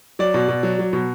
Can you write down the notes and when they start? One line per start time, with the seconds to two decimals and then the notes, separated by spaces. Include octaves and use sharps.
0.19 F#3 D5
0.34 B2
0.49 B2
0.63 F#3
0.79 F#3
0.93 B2